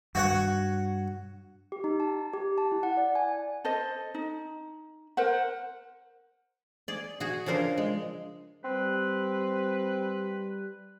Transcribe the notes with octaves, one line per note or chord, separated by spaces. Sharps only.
G2 F#4 C#5 F#5
G4
D#4
A5
G4
A5
E4
F#5
D5
G#5
A4 C5 D#5
D#4
A#4 C5 F#5
G#4 D5
F#4 G#4
C#3 F3 D4 A#4 C5
G#3
G3 C4 B4